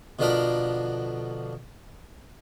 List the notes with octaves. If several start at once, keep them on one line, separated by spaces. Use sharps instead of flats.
B2 D3 F3 D4 A#4 B5